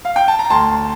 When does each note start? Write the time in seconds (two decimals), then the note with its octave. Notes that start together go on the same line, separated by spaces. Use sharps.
0.05 F5
0.16 G5
0.28 A5
0.39 A#5
0.50 D2 A5 C6